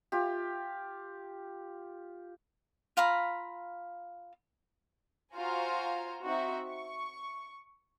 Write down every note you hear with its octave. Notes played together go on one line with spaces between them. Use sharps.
F4 G4
F4 F5 A#5 B5
F4 F#4 C5 F5 G#5 A#5
C4 D#4 F#4 E5
C#6